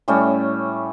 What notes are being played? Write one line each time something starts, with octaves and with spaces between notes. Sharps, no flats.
A2 G3 A3 C#4